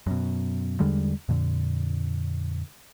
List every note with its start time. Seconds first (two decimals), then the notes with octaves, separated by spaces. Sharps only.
0.07 F#2 B2
0.80 E2 D3 G3 G#3
1.29 F2 A#2 D3